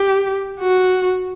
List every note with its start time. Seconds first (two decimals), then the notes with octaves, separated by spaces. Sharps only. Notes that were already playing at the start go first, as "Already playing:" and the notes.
Already playing: G4
0.60 F#4